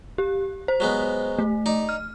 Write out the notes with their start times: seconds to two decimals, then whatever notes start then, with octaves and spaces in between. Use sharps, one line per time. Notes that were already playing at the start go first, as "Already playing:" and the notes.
0.18 G4
0.68 C5
0.80 F#3 G#3 B3
1.39 A3
1.66 D#4 D5
1.89 F6